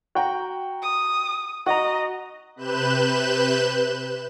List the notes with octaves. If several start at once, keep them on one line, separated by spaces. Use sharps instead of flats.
F#4 G5 A#5
D#6
F#4 D#5 A#5
C3 B4 F#6 G6 E7